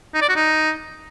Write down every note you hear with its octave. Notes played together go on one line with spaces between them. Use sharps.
D#4
D5
F#4
D#4